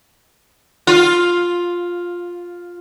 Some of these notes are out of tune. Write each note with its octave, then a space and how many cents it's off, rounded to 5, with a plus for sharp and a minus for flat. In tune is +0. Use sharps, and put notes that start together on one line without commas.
F4 +5